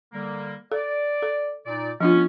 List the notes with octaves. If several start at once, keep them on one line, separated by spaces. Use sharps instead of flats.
D3 G3 A#3
A4 D5
A4
A#2 D#4 D5
F3 B3 C#4 D4 F4